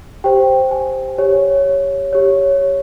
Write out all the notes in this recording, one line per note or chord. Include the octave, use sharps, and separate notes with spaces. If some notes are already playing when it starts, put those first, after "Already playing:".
G4 C5 G5
G#5
G4 C#5
G4 C#5